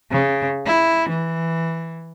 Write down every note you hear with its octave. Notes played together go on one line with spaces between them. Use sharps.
C#3
E4
E3